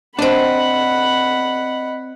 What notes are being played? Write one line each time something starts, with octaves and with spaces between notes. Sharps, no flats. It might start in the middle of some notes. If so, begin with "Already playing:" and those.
C4 D4 D#5 F#5 B5